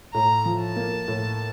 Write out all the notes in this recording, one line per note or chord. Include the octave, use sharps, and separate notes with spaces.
A2 A#5
F3
A5
A#3
A2